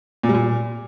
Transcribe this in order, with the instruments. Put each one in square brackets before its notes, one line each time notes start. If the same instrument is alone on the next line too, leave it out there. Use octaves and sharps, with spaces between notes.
[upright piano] A#2
G3
A#2